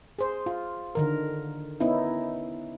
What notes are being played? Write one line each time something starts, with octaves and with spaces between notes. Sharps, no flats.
G#4 C5
F4
D3 D#3 A#4
B3 C#4 D#4 E4